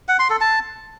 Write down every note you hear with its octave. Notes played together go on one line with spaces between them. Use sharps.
F#5
C6
A4
A5